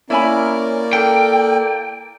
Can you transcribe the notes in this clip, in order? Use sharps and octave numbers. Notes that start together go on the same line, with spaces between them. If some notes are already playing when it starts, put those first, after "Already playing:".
A#3 C#4 E4 A#4 D5 G#5 B5
A4 G5